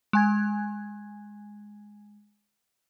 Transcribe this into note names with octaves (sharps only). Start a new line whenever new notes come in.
G#3 G#5 G#6